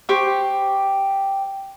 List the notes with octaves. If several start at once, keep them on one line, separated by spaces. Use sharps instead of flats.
G4 C5 C#6 D6